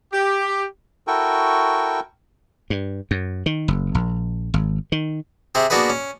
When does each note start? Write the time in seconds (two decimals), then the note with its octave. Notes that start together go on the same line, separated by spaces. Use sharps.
0.13 G4
1.07 E4 F#4 A4 A#4 G5 C#6
2.70 G2
3.11 F#2
3.46 D#3
3.68 F#1
3.95 A#1
4.54 G#1
4.92 D#3
5.55 C3 C4 G#4
5.70 A#3 B3 D4 F#4 G#4 B4
5.90 C#4